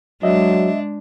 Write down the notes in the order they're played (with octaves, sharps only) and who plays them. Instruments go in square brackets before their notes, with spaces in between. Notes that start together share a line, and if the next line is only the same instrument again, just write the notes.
[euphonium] F#3 [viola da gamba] G#3 D4 [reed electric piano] D#5 E5